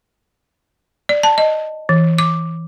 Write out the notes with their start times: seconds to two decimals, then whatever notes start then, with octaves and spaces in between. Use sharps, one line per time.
1.09 D5
1.23 A5
1.38 D#5
1.89 E3
2.18 D6